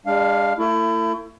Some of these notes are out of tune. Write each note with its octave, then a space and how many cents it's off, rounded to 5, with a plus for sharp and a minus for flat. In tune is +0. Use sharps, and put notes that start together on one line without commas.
G#3 -35 D4 +0 F5 +0
A3 +35 E4 +25